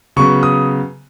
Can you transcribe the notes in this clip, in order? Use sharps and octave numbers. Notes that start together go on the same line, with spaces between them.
C#3 F#3 B3 C#6
D#6